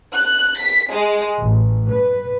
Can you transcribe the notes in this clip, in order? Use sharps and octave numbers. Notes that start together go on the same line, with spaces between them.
F#6
B6
G#3
A1
B4